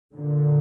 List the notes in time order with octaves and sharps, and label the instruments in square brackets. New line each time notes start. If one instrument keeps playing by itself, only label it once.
[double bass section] A#2 D3